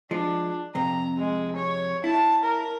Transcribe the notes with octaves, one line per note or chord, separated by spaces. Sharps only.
F3 G#3 D4
F2 C3 A#5
G#3
C#5
E4 A5
A#4